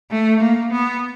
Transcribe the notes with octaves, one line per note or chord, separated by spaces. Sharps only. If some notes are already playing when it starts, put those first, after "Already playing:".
A3
A#3
B3